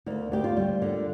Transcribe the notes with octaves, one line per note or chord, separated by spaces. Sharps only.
D2 A#3
D2 G4
F4
G3
D3 A#3